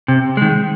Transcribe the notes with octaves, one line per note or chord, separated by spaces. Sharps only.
C3
D#3 G#3